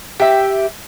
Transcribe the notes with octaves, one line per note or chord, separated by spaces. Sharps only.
G4 E5